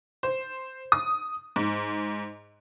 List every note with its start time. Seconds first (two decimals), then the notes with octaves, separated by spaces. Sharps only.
0.23 C5
0.92 D#6
1.56 G#2